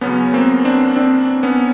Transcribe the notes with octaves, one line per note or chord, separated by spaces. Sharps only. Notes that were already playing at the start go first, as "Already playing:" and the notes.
E2 C#3 F#3 B3 C#4
A#3 C4
C4 D4
C4 D4
B3 C#4